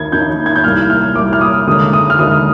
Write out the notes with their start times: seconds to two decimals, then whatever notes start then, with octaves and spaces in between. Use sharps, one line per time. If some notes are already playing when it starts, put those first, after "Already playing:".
Already playing: D#2 D#3 A#3 D#4 G#6
0.12 D#2 D#3 A#3 D#4 G6
0.46 G#6
0.56 G6
0.64 C2 A#2 G3 F6
0.90 F6
1.15 C2 A#2 G3 D6
1.33 F6
1.41 D#6
1.67 D#2 D3 G#3 D#4 D#6
1.93 D#6
2.10 F6
2.19 D#2 D3 G#3 D#4 D#6